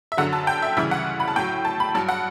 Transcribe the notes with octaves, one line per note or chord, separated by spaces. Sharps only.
E5
F#2 D3 F#3 F#5
A5
G5
E5
D2 C#3 E3 G3 E5
F#5
B5
A5
A2 F#3 G5
A5
B5
G2 F#3 A5
F#5